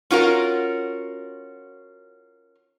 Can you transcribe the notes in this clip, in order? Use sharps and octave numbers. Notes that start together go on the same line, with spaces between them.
C#4 F4 F#4 A#4